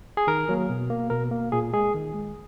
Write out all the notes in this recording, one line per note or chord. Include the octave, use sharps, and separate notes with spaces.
G#4
D#3 A#4
F#3 A#3
B2
A#3
B2 A#4
A#3
A#2 G#4
G#3 G#4
D#3
G#3